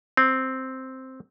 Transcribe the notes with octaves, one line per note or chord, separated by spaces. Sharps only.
C4